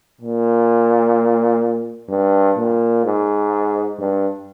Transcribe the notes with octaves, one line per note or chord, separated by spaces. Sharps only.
A#2
G2
A#2
G#2
G2